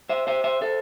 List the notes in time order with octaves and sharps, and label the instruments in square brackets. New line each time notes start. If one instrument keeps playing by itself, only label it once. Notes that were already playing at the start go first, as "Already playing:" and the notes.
[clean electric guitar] C5 E5
C5 E5
C5 E5
A4 C5